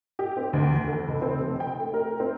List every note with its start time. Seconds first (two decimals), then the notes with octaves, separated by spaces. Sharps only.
0.19 G4
0.37 C4
0.53 D2
0.72 E2
0.87 A4
1.08 C#2
1.22 C4
1.39 F1
1.60 G5
1.80 A3
1.94 A#4
2.20 C4